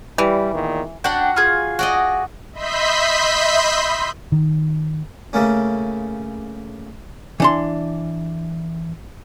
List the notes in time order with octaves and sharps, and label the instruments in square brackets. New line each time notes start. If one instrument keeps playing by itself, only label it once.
[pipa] E3 [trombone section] G3
[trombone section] E2 A#2 D#3
[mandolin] D4 G5 [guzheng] F#4 F#5
[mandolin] F4 G#4
[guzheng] F#4 D5 D#5
[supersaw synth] D#5 E5 B5 C6 G6 B6
[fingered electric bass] D#3
[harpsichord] C#3 A3 A#3 C#4
[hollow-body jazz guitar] E3 D4 C6